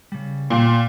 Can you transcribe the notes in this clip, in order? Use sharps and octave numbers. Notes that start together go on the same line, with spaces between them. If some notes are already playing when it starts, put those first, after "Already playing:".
C#3 G3
A#2 F5 G5